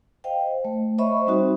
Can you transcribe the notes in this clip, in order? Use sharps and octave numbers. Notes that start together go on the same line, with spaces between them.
C5 D#5 F5 G5
A3
C5 C#5 D#5 E5 B5 C#6
G3 C4 D#4 F#4